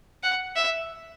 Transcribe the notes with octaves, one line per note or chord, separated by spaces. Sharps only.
F#5
E5